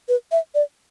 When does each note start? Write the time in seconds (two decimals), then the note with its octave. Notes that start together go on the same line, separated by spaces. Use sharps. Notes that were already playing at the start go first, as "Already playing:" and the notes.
0.09 B4
0.32 E5
0.55 D5